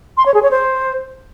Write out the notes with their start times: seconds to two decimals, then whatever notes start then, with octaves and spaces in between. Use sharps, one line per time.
0.17 C6
0.26 C#5
0.34 G#4
0.43 C#5
0.51 C5